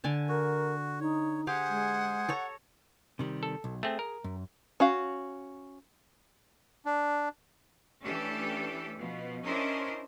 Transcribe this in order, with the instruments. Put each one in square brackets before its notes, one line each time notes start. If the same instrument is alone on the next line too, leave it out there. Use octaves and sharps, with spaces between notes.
[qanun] D3 G#5 A5
[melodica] F#4 [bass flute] A#4
[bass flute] D#4 [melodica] C#5
[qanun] G4 F5 [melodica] G#4 C5 G#5 [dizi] F#5
[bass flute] G#3
[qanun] A4 C#5 A#5
[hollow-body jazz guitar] C3 D#3 G3
[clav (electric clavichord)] A4
[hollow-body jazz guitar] B1
[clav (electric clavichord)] A3 C4 [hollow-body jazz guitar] G#4
[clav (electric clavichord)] A#4
[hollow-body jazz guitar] F#2
[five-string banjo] C#4 F#4 F5
[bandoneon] D4
[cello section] E3 A3 C#4 D4 G4 A4
B2 F3
C#4 D4 E4 A#4 C5 D#5